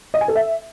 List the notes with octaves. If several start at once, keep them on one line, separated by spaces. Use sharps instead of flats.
D#5
G#5
A4
E5